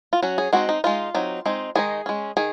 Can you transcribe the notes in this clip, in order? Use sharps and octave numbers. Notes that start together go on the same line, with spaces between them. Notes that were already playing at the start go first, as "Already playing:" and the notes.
F4
F#3 C#4 F#4
G#4
G#3 C4 D#4 F#4
D#4
G#3 D#4 F4
F#3 C4 D#4
G#3 C4 D#4
D#3 G#3 D#4 G#4
G#3 C#4
D#3 G#4